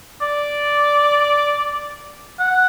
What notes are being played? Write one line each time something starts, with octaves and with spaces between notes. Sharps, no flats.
D5
F#5